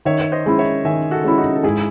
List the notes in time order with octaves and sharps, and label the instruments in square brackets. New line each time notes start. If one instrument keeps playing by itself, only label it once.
[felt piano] D#3 [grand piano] C#5 E5
[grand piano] C#5
C5 D#5
[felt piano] G#3 C#4 E4
[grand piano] C#5 E5
[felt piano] D#3 [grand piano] E5 G#5
[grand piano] F#4 A4
[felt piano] G#3 C#4 E4
[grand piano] D#4 F#4
A4
[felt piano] G#2 [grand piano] E4 G#4